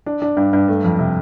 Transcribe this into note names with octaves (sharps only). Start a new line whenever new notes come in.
D4
D4
G2
G2
A3
F2
C3